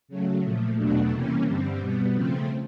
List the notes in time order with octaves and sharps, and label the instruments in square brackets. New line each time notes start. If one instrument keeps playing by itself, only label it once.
[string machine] C#3 F#3 A3
A#2 F3 A3
E2 B2 F#3 A3 D4
C3 E3 G3 A#3 C#4
G2 D3 G3 C4
B2 G3 B3
C#3 F3 A3 C4